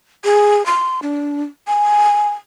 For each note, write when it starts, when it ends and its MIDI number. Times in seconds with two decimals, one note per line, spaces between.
0.24 0.65 68
0.66 1.00 84
1.02 1.43 62
1.67 2.29 80